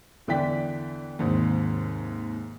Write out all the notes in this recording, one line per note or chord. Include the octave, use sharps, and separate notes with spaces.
E2 D3 E3 D5 G5 B6
D#2 G#2 C3